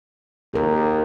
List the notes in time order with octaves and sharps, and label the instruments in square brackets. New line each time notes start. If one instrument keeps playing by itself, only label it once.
[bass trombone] D#2 [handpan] G#4 A#4